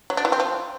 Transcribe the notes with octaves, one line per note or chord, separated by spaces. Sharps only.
F#3
D4
E3
C4
F3